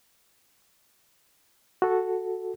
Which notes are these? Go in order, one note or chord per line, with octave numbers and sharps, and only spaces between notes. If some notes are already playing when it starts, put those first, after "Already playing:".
F#4 A4